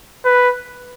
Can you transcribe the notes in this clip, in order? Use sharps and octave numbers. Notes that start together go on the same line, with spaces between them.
B4